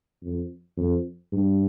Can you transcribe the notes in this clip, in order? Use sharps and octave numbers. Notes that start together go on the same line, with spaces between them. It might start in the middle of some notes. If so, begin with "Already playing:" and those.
F2
F2
G2